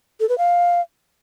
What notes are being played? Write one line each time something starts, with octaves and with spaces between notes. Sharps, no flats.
A4
B4
F5